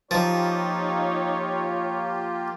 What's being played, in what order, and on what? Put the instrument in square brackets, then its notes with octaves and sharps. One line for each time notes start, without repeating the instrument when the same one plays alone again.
[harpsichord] F3 [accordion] A#3 F4 G4 [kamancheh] D#4 [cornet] C#5